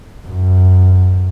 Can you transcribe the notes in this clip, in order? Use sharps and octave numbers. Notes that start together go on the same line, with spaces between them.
F#2